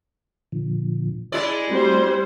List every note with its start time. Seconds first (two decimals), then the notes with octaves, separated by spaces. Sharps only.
0.52 A#2 D3 F3
1.32 G#3 E4 G#4 D5
1.70 G3 A3 C4 F#4 C5